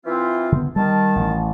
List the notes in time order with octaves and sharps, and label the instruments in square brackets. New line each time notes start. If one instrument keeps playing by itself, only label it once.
[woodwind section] E3 C4 F4
[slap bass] D3 B3
[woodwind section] D#3 A5 [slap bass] G3
[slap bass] A1